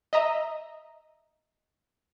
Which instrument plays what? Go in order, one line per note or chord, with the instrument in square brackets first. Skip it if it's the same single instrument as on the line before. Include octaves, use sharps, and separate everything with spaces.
[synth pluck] D#5 E5 A#5 D#6